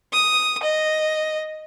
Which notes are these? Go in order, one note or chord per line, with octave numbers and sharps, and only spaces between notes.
D#6
D#5